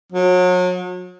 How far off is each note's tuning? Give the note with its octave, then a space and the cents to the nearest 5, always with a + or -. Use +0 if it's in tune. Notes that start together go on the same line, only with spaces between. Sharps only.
F#3 -35